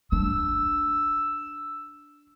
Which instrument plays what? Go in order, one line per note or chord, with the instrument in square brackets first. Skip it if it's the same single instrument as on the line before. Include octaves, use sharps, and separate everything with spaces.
[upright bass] D4 [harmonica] E6